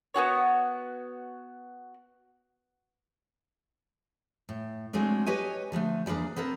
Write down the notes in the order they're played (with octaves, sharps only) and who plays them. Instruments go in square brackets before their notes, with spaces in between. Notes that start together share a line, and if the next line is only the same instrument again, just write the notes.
[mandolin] B3 C4 F#4 C#5
[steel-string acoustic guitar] A2
F#3 G#3 A3 C4 D4
G4 B4 C#5 D#5 G#5
D3 F3 G#3 A3
E2 G3 A#3 D4 G#4
B3 C4 A4 A#4